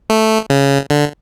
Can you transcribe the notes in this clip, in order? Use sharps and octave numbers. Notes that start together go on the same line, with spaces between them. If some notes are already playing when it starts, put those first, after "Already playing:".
A3
C#3
D3